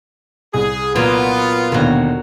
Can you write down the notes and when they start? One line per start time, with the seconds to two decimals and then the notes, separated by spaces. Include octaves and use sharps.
0.54 C2 G#4
0.95 A#2 F#3 B3 F4 B4
1.72 D#2 B2 D3 F#3 F#4